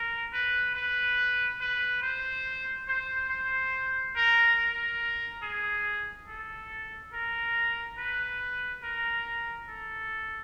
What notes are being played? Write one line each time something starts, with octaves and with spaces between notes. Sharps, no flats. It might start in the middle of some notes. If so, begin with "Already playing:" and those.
Already playing: A#4
B4
B4
B4
C5
C5
C5
A#4
A#4
G#4
A4
A#4
B4
A#4
A4